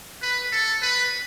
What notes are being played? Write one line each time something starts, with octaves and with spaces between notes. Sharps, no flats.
B4
A4
B4